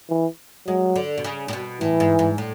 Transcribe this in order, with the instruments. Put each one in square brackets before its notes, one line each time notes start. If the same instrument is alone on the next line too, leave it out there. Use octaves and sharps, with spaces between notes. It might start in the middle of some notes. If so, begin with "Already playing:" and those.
[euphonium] E3
[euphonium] F#3 [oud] G#3
[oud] D3
B2
C#3
A2
B2
[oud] A2 [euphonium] E3
[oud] G#2
G#2
A2